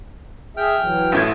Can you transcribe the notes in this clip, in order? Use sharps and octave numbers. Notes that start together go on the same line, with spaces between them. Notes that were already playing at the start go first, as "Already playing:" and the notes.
G#4 E5 G5 F6
E3 F#3
A1 A2 G#6